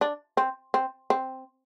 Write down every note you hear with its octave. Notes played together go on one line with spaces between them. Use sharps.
D4
C4
C4
C4